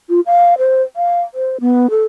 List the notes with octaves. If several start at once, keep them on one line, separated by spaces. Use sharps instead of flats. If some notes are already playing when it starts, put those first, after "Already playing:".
F4
F5
C5
F5
C5
B3
A4